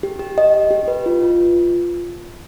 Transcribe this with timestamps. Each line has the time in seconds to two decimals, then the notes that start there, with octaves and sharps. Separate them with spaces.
0.03 G4
0.19 G4
0.38 D#5
0.54 D#5
0.71 G4
0.88 B4
1.06 F4
1.23 F4